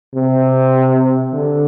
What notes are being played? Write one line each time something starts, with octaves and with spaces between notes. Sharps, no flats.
C3
D3